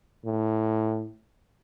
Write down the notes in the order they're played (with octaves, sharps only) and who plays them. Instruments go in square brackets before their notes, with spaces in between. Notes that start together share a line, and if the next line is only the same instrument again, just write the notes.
[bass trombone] A2